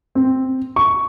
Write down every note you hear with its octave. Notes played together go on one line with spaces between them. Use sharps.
C4
C#6